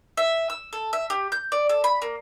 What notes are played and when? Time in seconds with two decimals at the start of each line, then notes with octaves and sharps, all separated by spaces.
0.17 E5
0.50 E6
0.73 A4
0.93 E5
1.10 G4
1.32 G6
1.52 D5
1.69 A4
1.84 B5
2.02 A#3